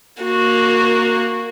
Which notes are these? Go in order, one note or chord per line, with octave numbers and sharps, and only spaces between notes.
A#3 F#4